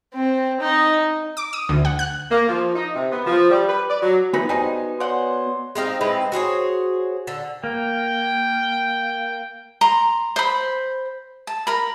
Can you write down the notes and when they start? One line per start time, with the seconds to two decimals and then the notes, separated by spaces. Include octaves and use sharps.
0.14 C4
0.61 D#4
1.37 D6
1.53 D#6
1.69 D2
1.85 F#5
1.99 F#6
2.30 A#3
2.48 F3
2.75 D#4
2.95 C3
3.11 B3
3.26 F3
3.50 G3
3.67 B4
3.89 D5
4.02 F#3
4.33 E3 B3 D#4 F#4 B4 B5
4.49 G3 D#4 G#4 C5 D#5 G#5
5.00 C#5 D5 F#5 C6
5.75 G#3 C4 D#4 F5
6.01 G#3 C4 E4 B4
6.32 F#4 G#4 C5 C#5
7.27 D3 A4
7.64 A#3 G5
9.81 A#5 C6
10.36 C5 B5
11.47 A5
11.67 A#4 B5